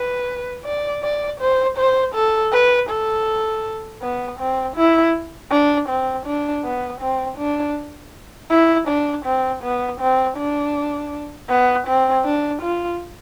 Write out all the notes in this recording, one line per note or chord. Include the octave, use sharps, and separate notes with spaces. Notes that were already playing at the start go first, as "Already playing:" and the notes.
Already playing: B4
D5
D5
C5
C5
A4
B4
A4
B3
C4
E4
D4
C4
D4
B3
C4
D4
E4
D4
C4
B3
C4
D4
B3
C4
D4
F4